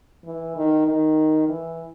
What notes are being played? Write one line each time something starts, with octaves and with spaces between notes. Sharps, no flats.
E3
D#3
D#3
E3